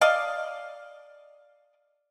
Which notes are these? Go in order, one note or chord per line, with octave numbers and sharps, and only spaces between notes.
D5 D#5 F5